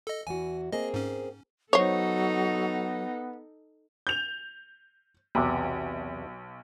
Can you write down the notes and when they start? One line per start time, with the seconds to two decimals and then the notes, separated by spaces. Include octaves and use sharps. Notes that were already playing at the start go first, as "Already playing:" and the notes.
0.07 A4 D#5
0.27 E2 E3 F#4 G#5
0.73 A#3 C4 G#4 D#5
0.94 G#2 C#4
1.73 F#3 B3 D#4 A4 C5 C#5
4.07 G6 F7
5.35 B1 E2 C3